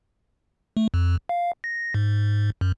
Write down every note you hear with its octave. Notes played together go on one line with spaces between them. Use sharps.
A3
F2
F5
A#6
G#2
F#2